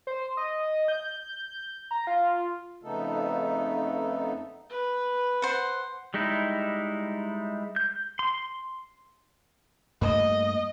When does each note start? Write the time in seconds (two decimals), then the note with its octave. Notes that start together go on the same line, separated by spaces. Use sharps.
0.07 C5
0.37 D#5
0.88 G6
1.91 A#5
2.07 F4
2.83 F2 C#3 A3 B3 D#4 A4
4.70 B4
5.42 C5 F#5
6.14 G3 G#3 D#4 E4
7.76 G6
8.19 C6
10.01 G2 A3 A#3 D#5